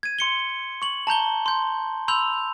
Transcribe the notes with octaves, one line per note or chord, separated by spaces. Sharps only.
G#6 D#7
C6 C#7 G7
C#6 F#7
A5 A#5 G6 G7
C6 G6
B5 C6 E6 G6 F7